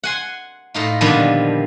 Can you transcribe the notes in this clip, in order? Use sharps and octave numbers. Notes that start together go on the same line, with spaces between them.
F#5 G#5 C6
A2 D#4 F4
A#2 D3 D#3 F3 G3 B3